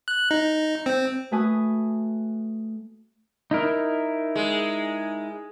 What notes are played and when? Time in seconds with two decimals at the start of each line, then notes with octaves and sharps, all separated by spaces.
0.08 F#6
0.31 D#4
0.86 C4
1.31 A3 F#4 B4 G#5 D#6
3.51 D#4 E4 A#4
4.35 G#3